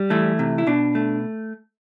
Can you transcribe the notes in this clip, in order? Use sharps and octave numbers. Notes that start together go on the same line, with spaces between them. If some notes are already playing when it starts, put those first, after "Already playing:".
Already playing: G3
E3 A3 E4
C3
E4
B2 D4
A3